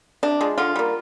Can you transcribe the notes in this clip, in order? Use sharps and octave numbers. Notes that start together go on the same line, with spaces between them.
C3 D4
F3 G#3
D3 F4
G3 A#3